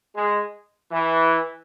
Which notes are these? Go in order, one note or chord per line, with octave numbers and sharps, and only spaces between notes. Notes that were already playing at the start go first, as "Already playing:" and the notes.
G#3
E3